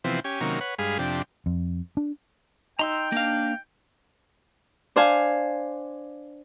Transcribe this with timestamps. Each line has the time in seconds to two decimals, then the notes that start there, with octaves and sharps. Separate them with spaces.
0.04 C3 E3 F3 B3 C4
0.24 C#4 G4 G#5
0.41 C3 D#3 F#3 A#3 C#4
0.61 B4 C#5 F#5
0.79 G2 G#3 G#4 F5 B5
0.99 F2 C3 D4 G4
1.46 F2
1.97 D4
2.79 D#4 G5 A#5 C6 E6
3.12 A#3 D4 F5
4.96 D4 C5 F5 G#5